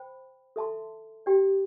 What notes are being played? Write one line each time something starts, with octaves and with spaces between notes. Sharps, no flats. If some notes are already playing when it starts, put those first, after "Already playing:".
Already playing: C5 G5 B5
A4 E5 A5 C6
G4 D5 G5